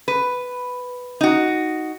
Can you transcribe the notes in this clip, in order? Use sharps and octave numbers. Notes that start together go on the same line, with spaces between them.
B4
D#4 F#4